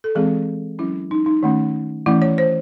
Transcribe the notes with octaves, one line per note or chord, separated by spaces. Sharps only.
A4
E3 G#3 C4 G#4
F#3 C#4 E4
D#4
D#4
D#3 A3 C#4
E3 A3 C#4 E4
C#5
C5